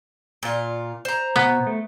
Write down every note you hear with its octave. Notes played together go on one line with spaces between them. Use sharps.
A#2 F4
C5 A#5
B2 B3
A3